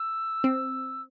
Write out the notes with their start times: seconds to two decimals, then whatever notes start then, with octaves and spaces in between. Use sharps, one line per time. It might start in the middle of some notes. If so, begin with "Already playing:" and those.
Already playing: E6
0.44 C4